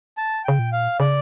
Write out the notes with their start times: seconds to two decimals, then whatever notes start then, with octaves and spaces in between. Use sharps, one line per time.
0.17 A5
0.45 C#3 G5
0.59 A#2
0.72 F5
1.00 C#3 D5